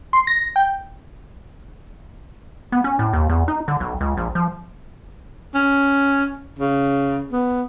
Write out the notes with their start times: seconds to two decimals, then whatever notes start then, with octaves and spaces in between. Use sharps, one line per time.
0.13 C6
0.27 A#6
0.56 G5
2.72 B3
2.84 C#4
2.99 A2
3.13 D#2
3.29 E2
3.48 D#4
3.68 D3
3.80 B1
4.01 C#2
4.17 A#1
4.35 F3
5.55 C#4
6.59 C#3
7.32 B3